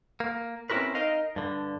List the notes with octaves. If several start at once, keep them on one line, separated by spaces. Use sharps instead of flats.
A#3
C4 C#4 E4 F#4 A#4 B4
D#4 A#4 D#5 F5
G2 D3